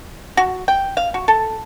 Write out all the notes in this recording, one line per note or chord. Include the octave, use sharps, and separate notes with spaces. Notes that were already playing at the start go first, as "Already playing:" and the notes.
F#4
G5
F5
F#4
A4